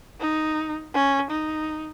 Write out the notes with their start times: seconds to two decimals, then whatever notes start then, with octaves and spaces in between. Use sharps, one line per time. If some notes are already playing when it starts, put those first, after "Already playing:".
0.20 D#4
0.94 C#4
1.31 D#4